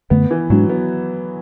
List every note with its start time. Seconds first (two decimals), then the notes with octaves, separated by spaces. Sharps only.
0.10 F#2 D3 A3 B3
0.31 E3
0.50 G#2 F#3 G#3 D4
0.70 B3